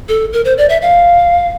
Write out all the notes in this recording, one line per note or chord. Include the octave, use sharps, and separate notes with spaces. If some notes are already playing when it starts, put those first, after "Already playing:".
A4
A#4
C5
D5
E5
F5